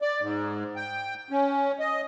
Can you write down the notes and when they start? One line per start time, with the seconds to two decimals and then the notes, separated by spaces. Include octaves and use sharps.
0.02 D5
0.21 G#2
0.76 G5
1.30 C#4
1.79 D#5